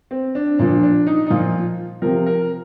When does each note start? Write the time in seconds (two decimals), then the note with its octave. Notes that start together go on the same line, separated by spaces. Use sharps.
0.11 C4
0.35 D4
0.59 A#2 F3 D4
0.83 D4
1.07 D#4
1.27 D#4
1.30 A#2 F3 F4
2.02 C3 F3 A#4
2.26 A#4